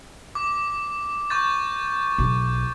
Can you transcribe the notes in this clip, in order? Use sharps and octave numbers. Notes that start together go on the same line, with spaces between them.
D6
C#6 G6 A6
B1